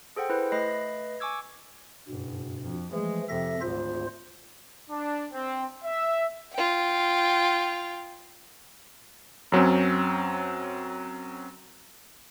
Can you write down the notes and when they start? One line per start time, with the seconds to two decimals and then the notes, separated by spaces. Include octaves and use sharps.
0.16 G#4 A4 C5 F#5 G5
0.30 E4 B4 C5
0.52 A3 B4 D#5 B5 A#6 C7
1.20 G#5 C#6 D6 E6 G#6
2.09 F#1 G2 B2
2.64 F2
2.93 E3 F3 G#3 A3
3.29 F2 C3 A4 E5 A#6
3.61 G#1 D2 F4 C5
4.90 D4
5.32 C4
5.84 E5
6.53 F4 G5
9.52 F#2 F#3 C4 C#4